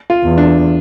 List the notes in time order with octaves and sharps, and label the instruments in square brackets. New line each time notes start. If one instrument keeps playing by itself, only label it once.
[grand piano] F4
[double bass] E2
[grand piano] D4